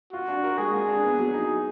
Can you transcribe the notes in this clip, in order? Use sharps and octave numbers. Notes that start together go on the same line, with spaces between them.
F4 F#4
D4
A#4
G#3 G#4
F4
D4
B3
F#3
D#4